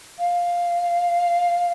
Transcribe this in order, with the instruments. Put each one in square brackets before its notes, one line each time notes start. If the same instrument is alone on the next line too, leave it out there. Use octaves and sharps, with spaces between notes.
[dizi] F5